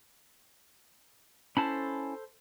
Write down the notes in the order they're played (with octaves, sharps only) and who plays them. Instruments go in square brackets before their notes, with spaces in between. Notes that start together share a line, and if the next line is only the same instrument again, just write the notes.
[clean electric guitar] C#4 E4 A5 [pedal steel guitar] A4 C5 B5